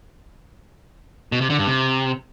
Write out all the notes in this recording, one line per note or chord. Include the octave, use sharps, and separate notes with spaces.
B2
C3
D3
G2
C3